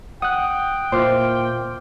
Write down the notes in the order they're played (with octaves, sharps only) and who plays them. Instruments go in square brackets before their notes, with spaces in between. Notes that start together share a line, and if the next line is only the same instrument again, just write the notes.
[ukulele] F#5 [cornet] G5 [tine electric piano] D#6 F#6
[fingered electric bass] A#2 [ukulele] E4 F4 C5 [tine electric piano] C6 D6 F6